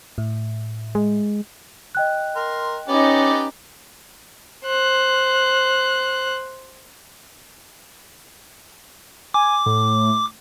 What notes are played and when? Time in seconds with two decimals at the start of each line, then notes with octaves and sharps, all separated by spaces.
0.18 A2
0.95 G#3
1.95 D#5 G5 F#6
2.36 A#4 C6
2.88 B3 C#4 D#4 G4 D5
4.65 C5 F#6
9.34 G#5 D6
9.66 A2